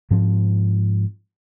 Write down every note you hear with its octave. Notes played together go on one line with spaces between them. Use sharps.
G#2 F3 C4